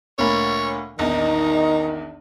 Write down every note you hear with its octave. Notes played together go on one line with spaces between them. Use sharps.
D2 A#2 C#5 B5
A#1 E2 D#3 D#4